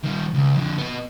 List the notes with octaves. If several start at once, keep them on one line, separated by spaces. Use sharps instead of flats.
D#3 G3
C#2
F2 D3
B3 D#5